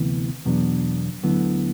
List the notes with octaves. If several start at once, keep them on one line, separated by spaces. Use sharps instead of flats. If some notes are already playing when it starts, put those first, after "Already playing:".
Already playing: D2 C3 E3 B3
E2 B2 F#3 B3 D4
D2 D3 F#3 B3 E4